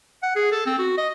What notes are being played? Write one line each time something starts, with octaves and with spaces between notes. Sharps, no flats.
F#5
G#4
A4
C4
F#4
D#5